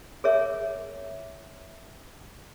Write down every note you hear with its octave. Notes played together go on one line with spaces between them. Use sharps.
G#4 A#4 C#5 E5